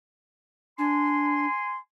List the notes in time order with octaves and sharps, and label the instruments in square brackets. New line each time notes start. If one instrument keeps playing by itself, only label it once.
[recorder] D4 [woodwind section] G#5 C6